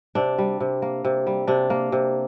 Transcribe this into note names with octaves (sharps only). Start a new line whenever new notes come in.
C3 D4
G3
C3
A#3
C3
G3
C3 D4
A#3
C3